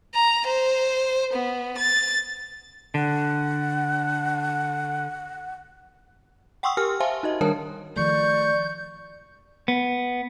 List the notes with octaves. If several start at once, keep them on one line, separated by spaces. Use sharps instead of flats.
A#5
C5
B3
A6
D3 F#5
F#5 G5 C6 C#6 D#6 E6
G4 A#4 G#5 F6
C5 E5 F5 G#5 A5 C6
D#4 F#4 D#5
D#3 G3 D4 A#4 C#5 A5
D#3 F3 A3 D5 C#6 G6
B3